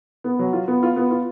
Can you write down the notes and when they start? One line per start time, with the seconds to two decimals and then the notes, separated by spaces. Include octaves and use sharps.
0.24 B3
0.39 F#3
0.53 F4
0.68 B3
0.83 F4
0.96 B3
1.11 F4